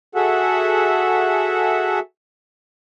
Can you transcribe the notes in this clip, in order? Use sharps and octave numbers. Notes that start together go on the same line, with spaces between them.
F#4 G#4 A4 E5 F#5